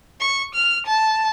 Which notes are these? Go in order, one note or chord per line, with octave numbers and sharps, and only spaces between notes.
C#6
F6
A5